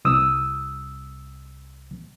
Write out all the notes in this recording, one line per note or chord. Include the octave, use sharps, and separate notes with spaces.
C2 D#6 E6